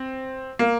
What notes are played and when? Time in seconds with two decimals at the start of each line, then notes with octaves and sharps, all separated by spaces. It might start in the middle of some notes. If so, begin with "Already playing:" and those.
Already playing: C4
0.59 A#3